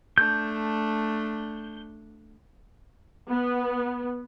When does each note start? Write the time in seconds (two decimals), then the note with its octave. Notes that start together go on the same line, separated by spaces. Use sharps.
0.18 A3 D4 G6
3.30 B3